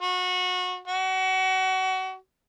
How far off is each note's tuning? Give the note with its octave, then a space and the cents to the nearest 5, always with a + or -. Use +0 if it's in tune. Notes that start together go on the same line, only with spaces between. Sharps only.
F#4 -25
F#4 +30